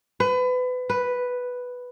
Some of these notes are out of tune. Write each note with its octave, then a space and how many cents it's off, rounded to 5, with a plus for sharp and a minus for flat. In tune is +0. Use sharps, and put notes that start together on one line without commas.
B4 +30
B4 +0